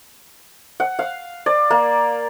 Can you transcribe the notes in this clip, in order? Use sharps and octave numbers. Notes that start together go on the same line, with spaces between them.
F#5
F5
D5
A#3